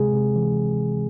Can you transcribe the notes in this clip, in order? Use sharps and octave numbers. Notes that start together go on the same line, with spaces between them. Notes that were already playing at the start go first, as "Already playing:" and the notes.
Already playing: C3 G#3 G#4
C3
E3